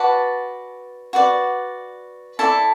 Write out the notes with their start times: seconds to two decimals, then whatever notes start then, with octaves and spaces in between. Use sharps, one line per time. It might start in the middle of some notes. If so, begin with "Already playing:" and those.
Already playing: F#4 B4 D5 A5
1.13 F#4 B4 D5
2.39 E4 A4 D5 A5